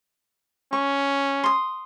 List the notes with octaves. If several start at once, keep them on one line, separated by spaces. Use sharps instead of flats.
C#4 C#6
C6 D#6